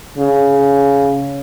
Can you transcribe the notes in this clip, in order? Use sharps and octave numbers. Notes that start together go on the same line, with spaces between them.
C#3